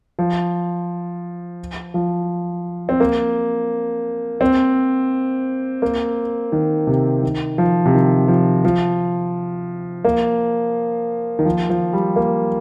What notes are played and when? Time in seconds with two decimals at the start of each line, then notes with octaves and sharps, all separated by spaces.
0.19 F3
1.94 F3
2.89 C4
3.00 A#3
4.41 C4
5.82 A#3
6.52 D#3
6.87 C3
7.23 D#3
7.58 F3
7.86 C3
7.94 D#3
8.28 F3
8.65 F3
10.05 A#3
11.39 D#3
11.45 F3
11.70 F3
11.93 G3
12.16 A#3